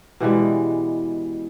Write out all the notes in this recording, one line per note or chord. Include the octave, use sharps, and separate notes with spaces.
B2 E3 G3 G#3